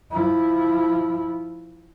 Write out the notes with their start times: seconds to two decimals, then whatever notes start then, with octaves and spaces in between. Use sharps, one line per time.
0.12 F3 E4